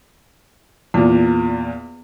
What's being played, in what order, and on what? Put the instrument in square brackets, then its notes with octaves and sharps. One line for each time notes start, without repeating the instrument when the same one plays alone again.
[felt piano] E2 A#2 [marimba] B3